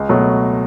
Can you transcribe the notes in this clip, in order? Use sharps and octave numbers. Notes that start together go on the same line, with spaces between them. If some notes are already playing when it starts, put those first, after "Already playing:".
Already playing: C#2
B2 F#3 A3